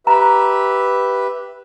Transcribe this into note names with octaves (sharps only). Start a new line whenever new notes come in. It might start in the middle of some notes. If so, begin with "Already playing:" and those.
G4 B4 E5 A#5